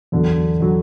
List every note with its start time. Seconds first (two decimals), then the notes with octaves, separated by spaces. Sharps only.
0.12 E2 D3 F#3
0.60 D3 F#3